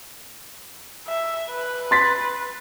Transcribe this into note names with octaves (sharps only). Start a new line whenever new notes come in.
E5
B4
C6 A6 B6